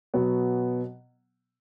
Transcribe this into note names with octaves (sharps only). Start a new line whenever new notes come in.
B2 F#3 B3